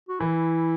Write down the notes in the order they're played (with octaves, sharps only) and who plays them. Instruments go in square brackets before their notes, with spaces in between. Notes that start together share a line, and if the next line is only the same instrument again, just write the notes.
[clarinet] F#4
[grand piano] E3 [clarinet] E4